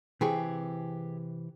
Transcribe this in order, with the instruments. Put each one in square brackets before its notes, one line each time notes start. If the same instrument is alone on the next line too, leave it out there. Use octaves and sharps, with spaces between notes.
[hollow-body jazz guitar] C3 E3 C4 [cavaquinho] G4 G#4 C#6